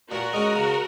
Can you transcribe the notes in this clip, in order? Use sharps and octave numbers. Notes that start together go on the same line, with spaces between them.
A#2 F#4 A#4
G#3 C#4
C#3